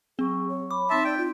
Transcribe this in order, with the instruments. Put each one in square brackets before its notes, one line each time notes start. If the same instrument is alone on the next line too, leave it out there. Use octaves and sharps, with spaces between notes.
[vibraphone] F#3 C#6 [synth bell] C4 [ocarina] G#4
[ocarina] C#5
[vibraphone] B5 [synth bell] D6
[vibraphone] C4 D#4 C6 [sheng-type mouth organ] E5 A5
[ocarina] D5 [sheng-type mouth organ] G5
[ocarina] F4